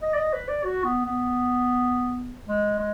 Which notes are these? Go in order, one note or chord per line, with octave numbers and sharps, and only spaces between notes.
D#5
D5
D#5
B4
D5
F#4
B3
B3
G#3
G#3